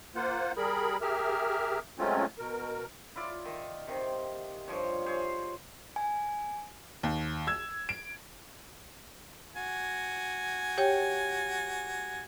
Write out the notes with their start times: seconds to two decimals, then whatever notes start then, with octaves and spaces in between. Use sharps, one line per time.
0.16 A#3 F4 C5 F#5
0.57 G3 G#4 A#4 B5
1.02 G4 G#4 A#4 E5 F6
1.99 F#3 G#3 A3 C4 C#4 F4
2.39 B2 A#4
3.16 E4 F4 D5
3.46 D#3
3.87 C3 D#3
4.68 G2 F3 C#5
5.06 G#4 C5 C#5
5.96 G#5
7.03 D#2
7.47 E6 G#6
7.89 D7
9.56 F#4 G#5
10.78 G4 C#5 G5